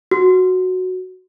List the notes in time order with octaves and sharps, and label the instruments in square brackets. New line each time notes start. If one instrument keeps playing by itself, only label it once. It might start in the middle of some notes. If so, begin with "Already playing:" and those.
[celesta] F#4